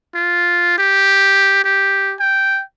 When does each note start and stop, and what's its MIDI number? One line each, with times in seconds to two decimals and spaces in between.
0.15 0.75 65
0.78 1.59 67
1.64 2.15 67
2.20 2.62 79